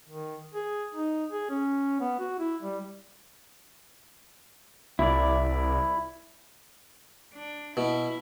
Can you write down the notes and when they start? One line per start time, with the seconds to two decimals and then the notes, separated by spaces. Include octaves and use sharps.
0.09 D#3
0.54 G#4
0.95 D#4
1.32 G#4
1.50 C#4
2.01 B3
2.19 F#4
2.39 E4
2.63 G3
4.99 C2 E4 D5
7.33 D4
7.77 B2 E4